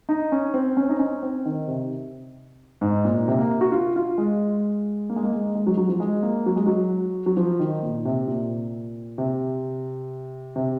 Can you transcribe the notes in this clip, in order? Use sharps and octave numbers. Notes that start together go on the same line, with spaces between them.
D#4
C#4
C4
C#4
D#4
C#4
C4
D#3
C3
G#2
A#2
C3
A#3
F#4
F4
F4
G#3
A#3
G#3
A#3
G#3
G#3
F#3
F#3
F3
G#3
A#3
F#3
G#3
F#3
F#3
F3
D#3
A#2
C3
A#2
C3
C3